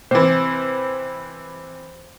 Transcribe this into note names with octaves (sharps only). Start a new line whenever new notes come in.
C3 E3 C5